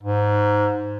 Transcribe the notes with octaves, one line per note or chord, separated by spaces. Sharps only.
G#2